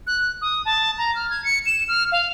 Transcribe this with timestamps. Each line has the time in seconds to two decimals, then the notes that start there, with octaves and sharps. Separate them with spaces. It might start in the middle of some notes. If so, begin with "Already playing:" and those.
0.07 F#6
0.41 D#6
0.65 A5
0.98 A#5
1.15 F6
1.30 G#6
1.44 C#7
1.66 E7
1.88 F6
2.12 F5